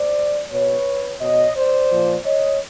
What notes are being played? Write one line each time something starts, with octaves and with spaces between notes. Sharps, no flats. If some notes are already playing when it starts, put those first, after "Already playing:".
Already playing: C5 D5
B2 B4 C#5
B2 C#5 D#5
C5 D5
A#2 F3
C#5 D#5